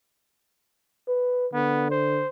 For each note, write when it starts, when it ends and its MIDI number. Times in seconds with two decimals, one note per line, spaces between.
1.08 1.47 71
1.54 2.23 50
1.54 1.89 59
1.91 2.29 72